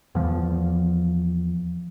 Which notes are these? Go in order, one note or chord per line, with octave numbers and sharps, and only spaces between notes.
E2 F3